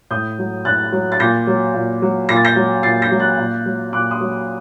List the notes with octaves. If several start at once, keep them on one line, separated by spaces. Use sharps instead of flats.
A2 D#6 G6
F#3
A2 F#6 A6
F#3
A6
A#2 G6 A#6
F#3
A#2
F#3
A#2 A#6
A6
G6 A#6
F#3
A#2 A6 C7
G6 A#6
F#3
F#6 A6
A#2
F#3
A#2 D6 F#6
C6 D#6
F#3